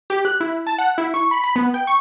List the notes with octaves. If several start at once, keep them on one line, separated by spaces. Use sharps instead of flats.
G4
F#6
E4
A5
F#5
E4
C#6
B5
B5
B3
G5
C#6